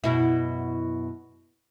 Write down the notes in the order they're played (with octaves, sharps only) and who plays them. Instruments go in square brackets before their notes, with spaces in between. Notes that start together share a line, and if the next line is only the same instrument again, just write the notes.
[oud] F#2 B2 E4